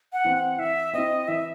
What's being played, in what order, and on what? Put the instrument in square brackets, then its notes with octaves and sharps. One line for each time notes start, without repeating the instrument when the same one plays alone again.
[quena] F#5
[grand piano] E3 C4
[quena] F#5
[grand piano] E3 [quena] E5
[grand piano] C4 E4 [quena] D#5
[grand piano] E3 [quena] E5